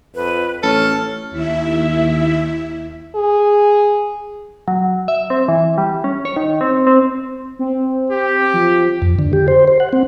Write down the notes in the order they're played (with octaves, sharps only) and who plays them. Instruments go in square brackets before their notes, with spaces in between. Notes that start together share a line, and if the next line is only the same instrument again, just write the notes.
[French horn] F2 [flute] B4
[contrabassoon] A1 [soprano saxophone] A4 [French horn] C#5 [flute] F6
[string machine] D#2 E4 E5
[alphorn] G#4
[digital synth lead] F#3
E5
C4
E3
G3
C#4
C#5
D#3
C4
C4
C4
[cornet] G4
[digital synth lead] F3
[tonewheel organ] F2
D3
G4
C5
C5
F#5
C4